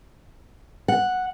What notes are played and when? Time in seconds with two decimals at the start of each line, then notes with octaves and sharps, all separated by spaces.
0.88 F#5